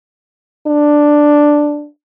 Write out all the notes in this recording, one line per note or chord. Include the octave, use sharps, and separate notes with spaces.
D4